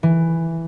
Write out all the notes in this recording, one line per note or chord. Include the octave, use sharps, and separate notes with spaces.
E3